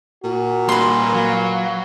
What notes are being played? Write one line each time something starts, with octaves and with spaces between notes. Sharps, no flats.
A#2 F#4
G3 A#3 B4 C6
F#3 F5